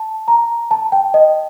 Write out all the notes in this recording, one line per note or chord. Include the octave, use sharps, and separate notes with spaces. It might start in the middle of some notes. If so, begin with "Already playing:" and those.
Already playing: A5
A#5
A5
G5
D#5